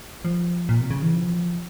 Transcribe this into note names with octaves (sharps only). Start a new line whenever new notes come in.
F3
A#2
C3
C#3
E3
F3